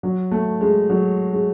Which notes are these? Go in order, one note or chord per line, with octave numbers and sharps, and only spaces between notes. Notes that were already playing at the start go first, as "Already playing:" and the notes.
F#3
A3
G#3
F#3
G#3